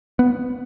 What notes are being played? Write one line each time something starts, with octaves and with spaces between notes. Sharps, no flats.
B3